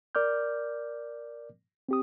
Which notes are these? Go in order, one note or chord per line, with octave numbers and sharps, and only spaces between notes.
A#4 D5 D6 F6 G6
C4 G4 D#6